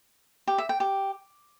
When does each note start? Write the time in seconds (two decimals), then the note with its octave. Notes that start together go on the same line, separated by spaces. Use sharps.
0.48 G4
0.58 E5
0.69 G5
0.80 G4